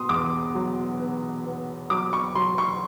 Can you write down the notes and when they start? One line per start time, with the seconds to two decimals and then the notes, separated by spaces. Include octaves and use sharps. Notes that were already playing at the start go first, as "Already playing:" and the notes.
Already playing: B2 B3 C6 D#6
0.09 E2 D6
0.55 F#3
1.00 B3
1.45 B3
1.90 F#3 D6
2.13 C#6
2.35 F#3 C6
2.58 C#6